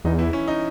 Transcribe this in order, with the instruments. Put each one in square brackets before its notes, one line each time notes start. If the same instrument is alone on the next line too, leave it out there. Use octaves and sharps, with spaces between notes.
[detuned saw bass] E2 [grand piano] D#4
[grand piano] E3 E4
C#4
D#4